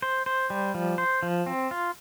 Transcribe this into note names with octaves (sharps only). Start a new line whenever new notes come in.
C5
C5
G3
F3
C5
F3
C4
F4